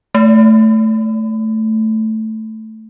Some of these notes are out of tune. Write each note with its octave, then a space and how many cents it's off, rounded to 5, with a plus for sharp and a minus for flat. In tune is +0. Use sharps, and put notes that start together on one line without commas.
A3 +0